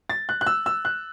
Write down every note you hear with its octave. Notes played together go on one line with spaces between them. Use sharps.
A6
F#6
F#6
E6
E6
F#6